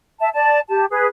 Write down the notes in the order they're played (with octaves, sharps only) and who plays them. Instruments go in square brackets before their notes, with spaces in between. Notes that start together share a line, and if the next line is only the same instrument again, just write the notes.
[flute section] E5 A5
D5 A5
G4 A5
G#4 B4